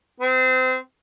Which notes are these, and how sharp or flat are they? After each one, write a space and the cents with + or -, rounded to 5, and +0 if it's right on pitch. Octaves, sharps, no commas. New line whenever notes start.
C4 -25